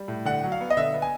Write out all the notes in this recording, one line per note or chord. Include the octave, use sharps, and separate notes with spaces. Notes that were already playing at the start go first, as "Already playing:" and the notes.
Already playing: G3
A2
D3 F#5
F#3
F5
B3
D#5
D3 E5
B3
G#5